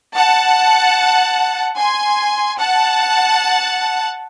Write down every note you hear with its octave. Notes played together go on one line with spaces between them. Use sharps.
F#5 A5
G#5 C6
F#5 A5